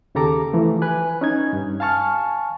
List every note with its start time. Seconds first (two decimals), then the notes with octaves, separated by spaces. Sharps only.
0.15 D#2 C#3 G4 A4 A#5 D6
0.53 E3 F3 A3
0.82 B4 G#5 F#6
1.21 C#4 D#4 G#6
1.53 G2
1.80 F5 G#5 A5 C#6 F6